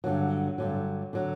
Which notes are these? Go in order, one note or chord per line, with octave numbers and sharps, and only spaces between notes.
G2 D3 F#3
G2 D3 F#3
D3 F#3